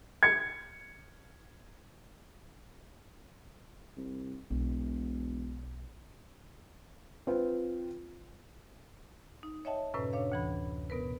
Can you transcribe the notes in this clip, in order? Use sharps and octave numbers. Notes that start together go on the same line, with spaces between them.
G#6 C#7
C2
E1 B1
C4 F4 B4 C5 G5
D#4
C#5 D#5 E5 G5 A5
F#2 A2 C3 C#4 B4
D4 C#5 F5
D2 E3 B5
B2 B3 A#4 B4